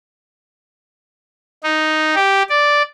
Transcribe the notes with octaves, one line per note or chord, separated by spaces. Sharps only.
D#4
G4
D5